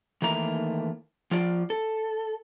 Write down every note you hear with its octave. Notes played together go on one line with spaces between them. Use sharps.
D#3 E3 A3 A#3 A#5
F3 F4 D5
A4